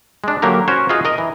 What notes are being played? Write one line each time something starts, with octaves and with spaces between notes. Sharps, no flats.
G#3 D4
D3 F#3 A#3 G4 A#4
C#4 F#4 A#4 C5 C#5
F4 F#4 G#4 D#5 F5
A#4 D#5
E3